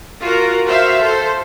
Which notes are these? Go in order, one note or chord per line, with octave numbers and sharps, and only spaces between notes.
F4 F#4 A#4
F#4 C5 E5 F5
A4 C5